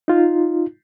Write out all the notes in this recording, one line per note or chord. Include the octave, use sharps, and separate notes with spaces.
D#4 F4